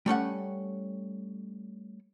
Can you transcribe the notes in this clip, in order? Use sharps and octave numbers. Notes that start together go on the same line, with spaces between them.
G3 A3 C#4 F#5